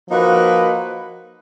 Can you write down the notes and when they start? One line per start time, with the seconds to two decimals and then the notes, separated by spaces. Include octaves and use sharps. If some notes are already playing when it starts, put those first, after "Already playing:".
0.09 F3 A#3 D#4 F#4 B4